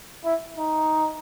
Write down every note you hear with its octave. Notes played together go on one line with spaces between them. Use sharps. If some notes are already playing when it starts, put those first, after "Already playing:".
E4
D#4